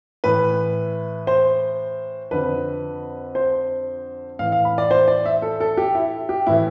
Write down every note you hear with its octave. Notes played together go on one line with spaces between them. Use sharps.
A2 E3 B4
C5
F2 D3 B4
C5
A2 E3 F5
F5
B5
D5
C5
D5
E5
A4
A4
G4
E4
G4
A2 E3 E4